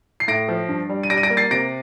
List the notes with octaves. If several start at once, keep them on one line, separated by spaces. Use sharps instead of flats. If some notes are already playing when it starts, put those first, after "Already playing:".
C7
A2 A#6 D7
F3
G2
G3
D#7
G3 A#6 D7
D#7
A#6 D7
A#3
A6 C7
C3 A#6 D7